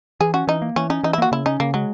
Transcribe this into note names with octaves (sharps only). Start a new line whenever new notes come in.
E3 G#4
C#4 F#4
E3 D#4
A#3
E3 C#4
C#4 D#4
E3 D#4
E4
A#3 F#4
C#3 E4
C#4 D#4
C#3 A#3
F#3 G#3